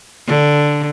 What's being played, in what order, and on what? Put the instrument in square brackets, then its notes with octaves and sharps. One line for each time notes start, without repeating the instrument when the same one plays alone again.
[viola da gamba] D3